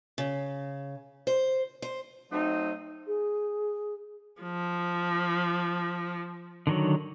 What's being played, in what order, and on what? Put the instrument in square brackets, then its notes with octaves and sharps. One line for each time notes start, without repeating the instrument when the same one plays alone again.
[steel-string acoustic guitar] C#3
C5
C5
[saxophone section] F#3 A3 C4 D#4
[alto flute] G#4
[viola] F3
[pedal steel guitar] D3 D#3 F#3